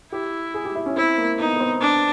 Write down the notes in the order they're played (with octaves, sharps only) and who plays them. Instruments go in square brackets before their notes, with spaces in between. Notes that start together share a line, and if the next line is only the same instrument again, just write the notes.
[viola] E4 [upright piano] G4
[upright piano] G#4
G4
E4
C#4
[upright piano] C4 [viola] E4
[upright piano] A#3
[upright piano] B3 [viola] D#4
[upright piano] B3
C4
[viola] D4